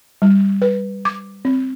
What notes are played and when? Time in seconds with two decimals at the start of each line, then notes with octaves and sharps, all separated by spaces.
0.22 G3
0.62 B4
1.05 D6
1.45 C4